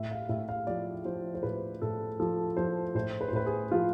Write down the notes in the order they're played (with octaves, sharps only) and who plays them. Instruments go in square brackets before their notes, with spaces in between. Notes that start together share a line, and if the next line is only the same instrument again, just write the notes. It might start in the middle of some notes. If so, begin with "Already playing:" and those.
Already playing: [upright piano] A2 E5
F5
A2 E5
F5
F3 D5
F3 C5
C5
A2 B4
A2 A4
F3 A4
F3 C5
A2 C5
B4
C5
A2 B4
G#4
F3 F4